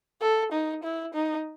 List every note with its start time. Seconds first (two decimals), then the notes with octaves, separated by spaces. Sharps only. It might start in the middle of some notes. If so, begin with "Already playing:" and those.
0.21 A4
0.52 D#4
0.84 E4
1.14 D#4